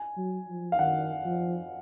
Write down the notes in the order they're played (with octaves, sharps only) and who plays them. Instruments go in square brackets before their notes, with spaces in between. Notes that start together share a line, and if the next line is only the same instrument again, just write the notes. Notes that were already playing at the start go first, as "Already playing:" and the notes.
Already playing: [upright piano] G#5
[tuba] F#3
F3
[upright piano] F5
[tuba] D#3 [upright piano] F#5
[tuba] F3